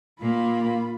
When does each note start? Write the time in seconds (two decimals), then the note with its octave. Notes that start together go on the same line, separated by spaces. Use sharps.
0.21 A#2 A#3 F4 B5